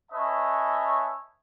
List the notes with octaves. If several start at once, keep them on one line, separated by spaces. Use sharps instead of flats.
C#4 B4 C#5 D#5 E5 A5